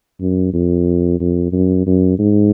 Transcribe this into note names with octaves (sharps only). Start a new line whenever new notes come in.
F#2
F2
F2
F#2
F#2
G#2